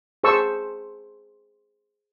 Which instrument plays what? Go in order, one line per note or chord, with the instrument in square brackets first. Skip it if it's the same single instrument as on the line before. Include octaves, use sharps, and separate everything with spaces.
[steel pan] G#4 C5 A5 C#6 E6